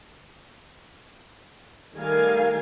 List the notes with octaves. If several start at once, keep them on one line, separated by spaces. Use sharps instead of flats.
D#3 G3 A3 A#4 F5 G#5